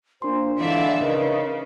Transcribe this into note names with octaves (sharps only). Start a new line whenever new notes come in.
A#2 D4 C5 C6
D3 E3 G#3 E4 D5 E5 F5
C#3 D#4 A#4 B4 D#5